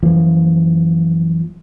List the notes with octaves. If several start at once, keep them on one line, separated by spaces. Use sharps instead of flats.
F#2 E3 F3 A#3